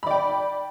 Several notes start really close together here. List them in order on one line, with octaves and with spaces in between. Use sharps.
B5 D5 G5